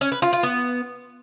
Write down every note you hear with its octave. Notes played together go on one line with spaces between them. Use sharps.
C#4
B4
F4
F4
B3